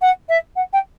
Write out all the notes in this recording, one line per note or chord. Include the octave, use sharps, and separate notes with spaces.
F#5
E5
F#5
G5